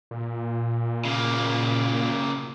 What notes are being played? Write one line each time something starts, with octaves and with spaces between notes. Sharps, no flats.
A#2
C#3 A#3